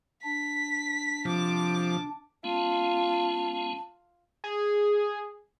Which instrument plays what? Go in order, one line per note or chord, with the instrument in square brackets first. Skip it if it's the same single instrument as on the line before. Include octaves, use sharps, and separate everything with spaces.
[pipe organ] D4 [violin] B6
[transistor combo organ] C3 F3 [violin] A5 D6
[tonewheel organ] G#3 B3 C#4 [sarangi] F4 [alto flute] A5
[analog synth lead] G#4